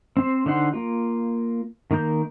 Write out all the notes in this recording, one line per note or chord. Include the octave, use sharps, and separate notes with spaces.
C4 C5
D3 D#4 C5 F#5 C6
A#3 F4
D#3 A#3 A#4 G6